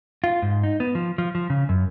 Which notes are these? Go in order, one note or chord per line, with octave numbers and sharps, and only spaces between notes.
F4
G#2
D#4
B3
F3
F3
F3
C#3
F#2